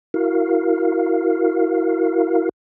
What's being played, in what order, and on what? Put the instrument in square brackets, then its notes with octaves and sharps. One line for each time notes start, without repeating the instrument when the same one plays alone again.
[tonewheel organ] E4 F#4 A#4 F5